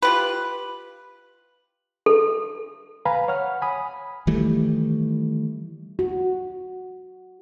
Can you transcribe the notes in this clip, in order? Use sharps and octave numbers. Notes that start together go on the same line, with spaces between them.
F4 G4 B4
A4
B4 F5 G#5 A#5 B5
C#5 F#5 F6
G#5 B5 D#6
D#3 E3 G3 A3
F#4